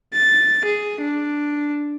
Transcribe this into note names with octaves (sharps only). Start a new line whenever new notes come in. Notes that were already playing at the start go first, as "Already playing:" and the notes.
A6
G#4
D4